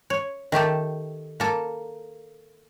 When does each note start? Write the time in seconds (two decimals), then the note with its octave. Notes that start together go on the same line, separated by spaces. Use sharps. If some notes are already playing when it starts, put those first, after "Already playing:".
0.10 C#5
0.52 D#3 A3 G4 A4
1.40 A#3 A4